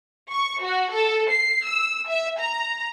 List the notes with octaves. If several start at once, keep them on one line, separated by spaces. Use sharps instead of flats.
C#6
F#4
A4
C7
E6
E5
A#5